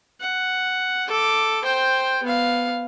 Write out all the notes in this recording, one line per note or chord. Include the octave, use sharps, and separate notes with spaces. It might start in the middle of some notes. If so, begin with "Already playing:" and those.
F#5
A4 D6
C5 G5
B3 F5